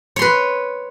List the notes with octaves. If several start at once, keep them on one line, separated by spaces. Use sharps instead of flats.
B4 C#5 C6